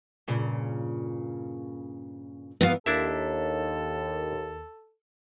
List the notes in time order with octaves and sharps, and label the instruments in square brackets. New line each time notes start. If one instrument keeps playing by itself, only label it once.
[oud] G2 A#2 C#3
[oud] E2 D#3 E3 [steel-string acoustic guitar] B3 F5
[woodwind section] D#2 [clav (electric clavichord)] D4 E4 E5 [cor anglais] A4